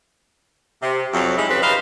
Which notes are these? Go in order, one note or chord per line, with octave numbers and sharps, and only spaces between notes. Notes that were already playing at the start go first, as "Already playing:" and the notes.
C3
F2 F#3
G#3 D#4 E4 G4
F2 C#3 C4 G4 B4
D#4 B4 C5 F5